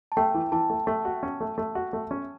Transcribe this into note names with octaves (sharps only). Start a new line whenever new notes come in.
A5
A3 G5
E3
E3 A5
A3
A3
F#4
C#4
A3
A3
F#4
A3
C#4